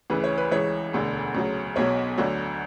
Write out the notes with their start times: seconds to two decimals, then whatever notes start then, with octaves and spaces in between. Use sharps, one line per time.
0.10 D2 C#3 E3 B4
0.24 C#5
0.38 B4
0.51 C#2 C#3 E3 C#5
0.93 E1 D2 D3
1.35 D2 C#3 F#3
1.76 B1 B2 F#3 C#5
2.18 D2 D3 F#3